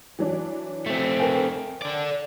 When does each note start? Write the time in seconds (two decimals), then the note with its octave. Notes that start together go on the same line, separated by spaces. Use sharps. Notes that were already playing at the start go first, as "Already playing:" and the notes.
0.19 E3 F#3 D4
0.86 A3 C4
1.18 A#4 G5 G#5
1.82 A4 D5